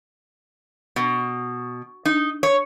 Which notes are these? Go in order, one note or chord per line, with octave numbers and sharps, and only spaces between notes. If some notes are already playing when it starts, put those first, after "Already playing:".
B2
D#4
C#5